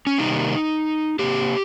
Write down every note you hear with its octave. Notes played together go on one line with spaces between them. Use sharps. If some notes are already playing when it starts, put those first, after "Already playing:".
C#4
C3 D#3 G3 A#3 D#4
C3 D#3 A#3 G4